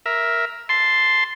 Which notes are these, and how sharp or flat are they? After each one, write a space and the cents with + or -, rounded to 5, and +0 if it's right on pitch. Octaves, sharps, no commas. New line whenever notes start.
A#4 +10 E5 +0
A5 +0 C6 +0